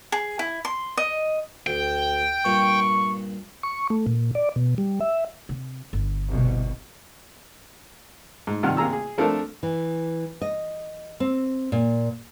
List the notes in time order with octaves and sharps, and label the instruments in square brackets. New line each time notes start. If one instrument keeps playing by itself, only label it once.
[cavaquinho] G#4
E4
C6
D#5
[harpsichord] D2 [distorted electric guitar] G5
[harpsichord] G2 A#2 [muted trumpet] C#6
[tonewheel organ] C#6
A3
A#2
D5
B2
G3
E5
[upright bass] C3
G1
[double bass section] C2 B2
[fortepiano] G#2
G2 C3 D#3 F#5 F6
C3 A#3 G#4 A#5 E6
G#4
F3 A3 C4 D4 A4 A#4
[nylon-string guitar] E3
D#5
C4
A#2